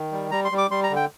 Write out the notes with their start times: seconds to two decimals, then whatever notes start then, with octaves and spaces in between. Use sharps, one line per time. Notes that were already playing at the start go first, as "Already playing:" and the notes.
Already playing: D#3
0.12 G3
0.31 G3 A#5
0.45 C6
0.52 G3
0.58 D6
0.71 G3 C6
0.83 A#5
0.90 D3
0.96 G5